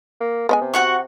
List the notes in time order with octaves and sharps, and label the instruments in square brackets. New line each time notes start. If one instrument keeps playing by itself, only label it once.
[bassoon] A#3
[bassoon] G#3 [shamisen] B3 C#5 G#5
[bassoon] C3
[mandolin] F#4 F#5 C#6